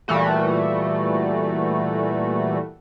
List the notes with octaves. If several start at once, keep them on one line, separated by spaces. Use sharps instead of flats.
A#2 E3 G3 A3 F#4